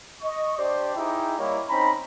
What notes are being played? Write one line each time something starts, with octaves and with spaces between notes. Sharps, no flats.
D#5 C#6
D4 G4 C5 D5
D#4 E4 G4 G#4 D#5 G5
G3 A#3 E4 C#5 D#5 A#5
C4 C#4 D#4 A#5 B5